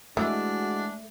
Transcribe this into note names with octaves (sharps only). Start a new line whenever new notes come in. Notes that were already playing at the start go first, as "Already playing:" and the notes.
E3 G#3 A3 D4 F#4